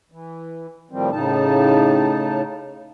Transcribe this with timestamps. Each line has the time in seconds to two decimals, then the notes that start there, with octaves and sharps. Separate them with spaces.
0.12 E3
0.91 A2 D#3 F3 G3 C4
1.12 A2 C#3 D#4 A5